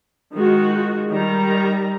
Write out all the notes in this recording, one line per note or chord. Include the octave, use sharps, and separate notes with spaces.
D#3 G#3 F4 F#4
D#3 G3 A#5